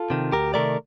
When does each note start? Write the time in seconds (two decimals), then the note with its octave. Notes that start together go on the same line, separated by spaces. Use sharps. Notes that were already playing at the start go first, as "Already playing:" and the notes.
Already playing: F4 A4
0.10 C3 D#3
0.32 D2 G4 A#4
0.54 C3 D#3 A3 A#4 D5